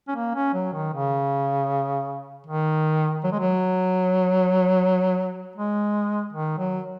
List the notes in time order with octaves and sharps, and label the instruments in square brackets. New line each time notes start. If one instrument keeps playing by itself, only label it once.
[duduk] C#4
A#3
C#4
F#3
D#3
C#3
D#3
F#3
G#3
F#3
G#3
D#3
F#3